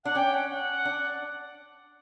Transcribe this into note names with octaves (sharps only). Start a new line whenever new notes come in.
D4 F#5
C#4 G5
F#5
F#5
D4